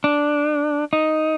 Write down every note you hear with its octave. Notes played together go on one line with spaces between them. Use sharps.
D4
D#4